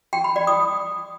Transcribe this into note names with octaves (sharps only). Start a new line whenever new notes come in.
G5
B5
D5
D#6